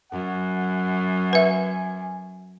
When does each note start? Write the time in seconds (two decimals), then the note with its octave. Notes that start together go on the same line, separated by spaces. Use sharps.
0.12 F#2 F#5
1.33 B4 E5 G#5